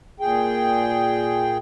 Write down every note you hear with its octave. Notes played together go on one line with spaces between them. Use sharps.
A#2 G#4 G5